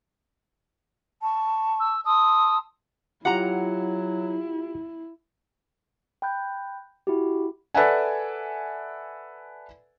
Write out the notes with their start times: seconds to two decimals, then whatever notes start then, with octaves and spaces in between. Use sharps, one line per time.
1.23 A5 C#6
1.80 E6
2.05 A5 C6 D#6 E6
3.25 F#3 E4 F4 G4 F#5 A#5
6.22 G5 B5 F#6 G6
7.07 E4 F#4 G4
7.74 A4 B4 D5 E5 F#5 G#5